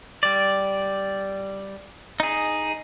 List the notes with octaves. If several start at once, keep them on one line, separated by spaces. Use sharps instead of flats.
G3 D5
D#4 G#4